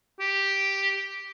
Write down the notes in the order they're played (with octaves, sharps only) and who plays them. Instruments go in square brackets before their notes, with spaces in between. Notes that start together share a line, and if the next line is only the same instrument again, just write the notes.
[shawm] G4